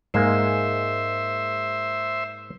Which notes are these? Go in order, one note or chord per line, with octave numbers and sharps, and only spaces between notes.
G#2 G#3 A#3 C5 E5